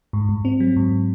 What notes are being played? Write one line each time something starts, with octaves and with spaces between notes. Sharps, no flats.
G#2
G#2
C4
F#3
G#2